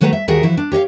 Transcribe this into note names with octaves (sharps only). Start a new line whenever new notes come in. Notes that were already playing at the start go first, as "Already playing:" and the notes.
D#3 F#3 A3 B4 G#5 A#5
E5
D#2 F#4 G#4 A#4 E5 F#5
E3 F3 E4 F#4
D4
G4 C#5 D#5 F5